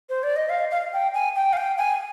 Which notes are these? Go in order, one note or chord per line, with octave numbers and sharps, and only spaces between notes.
C5
D5
D#5
F5
F5
G5
G#5
G5
F5
G5
G#5